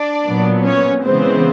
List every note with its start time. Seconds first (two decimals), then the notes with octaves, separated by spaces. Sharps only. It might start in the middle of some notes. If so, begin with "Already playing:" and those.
Already playing: D4 D5
0.27 A#2 F#3 B3
0.65 C#4 C#5
1.04 C#3 E3 G#3 B3 C4 C5